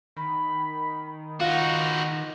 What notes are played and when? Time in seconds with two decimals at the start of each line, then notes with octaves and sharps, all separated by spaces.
0.17 D#3 B5
1.40 D#4 F4 F#4 F#5